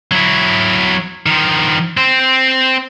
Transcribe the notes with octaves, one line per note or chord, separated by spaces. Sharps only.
F#3 E4
D#3 F3
C4 C5